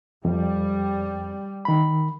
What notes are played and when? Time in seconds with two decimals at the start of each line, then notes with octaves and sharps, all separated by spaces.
0.25 F2 G3
1.65 D#3 B5